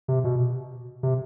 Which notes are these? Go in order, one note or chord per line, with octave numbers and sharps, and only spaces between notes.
C3
B2
C3